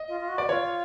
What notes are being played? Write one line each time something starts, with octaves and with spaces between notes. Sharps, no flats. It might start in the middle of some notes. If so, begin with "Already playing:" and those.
Already playing: D#5
F4
F4
F#4
D5
F4 C#5